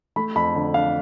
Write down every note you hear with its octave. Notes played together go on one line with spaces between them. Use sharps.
A3 B5
F2 B5
D3
D4 F5